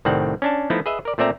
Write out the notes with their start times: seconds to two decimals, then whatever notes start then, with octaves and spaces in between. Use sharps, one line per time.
0.05 C2 A2 D#3 G3 C4 F#5
0.42 C#4 D4 A5
0.70 F3 A3 B3 D#4 E4
0.86 G#4 B4 D#5 E5
1.05 A#4 D5
1.18 A#2 A3 C4 D5 E5 A#5